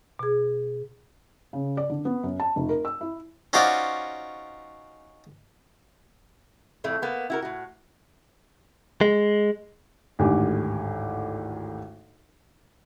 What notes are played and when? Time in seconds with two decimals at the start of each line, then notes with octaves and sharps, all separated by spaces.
0.19 B2 G#4
1.53 C#3
1.77 D5
1.90 D3
2.05 B3
2.23 F#2
2.40 A5
2.56 F1
2.69 A#4
2.85 E6
3.01 E4
3.53 C#4 D#4 F4 F#4 C5 D5
6.84 F2 A2 A3
7.02 A#3 B3
7.30 E4 F#4 A#4
7.42 A2 F#4
9.01 G#3
10.19 G#1 D2 A2 G4 G#5